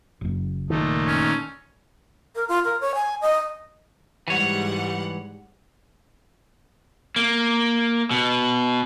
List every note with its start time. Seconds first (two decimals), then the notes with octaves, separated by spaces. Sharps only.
0.21 F#1 F#2
0.70 A#2 D#3 A3 D#4
1.06 C#4
2.35 A#4
2.49 F4
2.65 A#4
2.81 C#5
2.95 G#5
3.21 D#5
4.28 G#2 E3 G3 C#5 F#5
7.16 A#3
8.11 B2